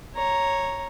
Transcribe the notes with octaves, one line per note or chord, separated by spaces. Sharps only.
C#5 A#5